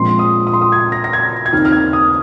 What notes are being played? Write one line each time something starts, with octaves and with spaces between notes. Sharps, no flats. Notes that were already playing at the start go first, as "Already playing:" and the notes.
Already playing: A#1 A#2 G#3 C4 C6
D#6
D#6
C6
D#6
G#6
A#6
A#6
G#6
G#6
D#2 D#3 C4 D#4 F6
F6
G#6
D#6